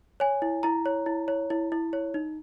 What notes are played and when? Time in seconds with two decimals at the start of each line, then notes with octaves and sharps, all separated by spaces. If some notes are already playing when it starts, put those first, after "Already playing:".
0.20 C#5 G#5
0.42 E4
0.63 E4 A#5
0.86 C#5
1.06 E4
1.28 C#5
1.50 E4
1.72 E4
1.93 C#5
2.14 D#4